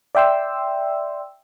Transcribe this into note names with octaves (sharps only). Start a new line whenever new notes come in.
D5 E5 G5 C6 E6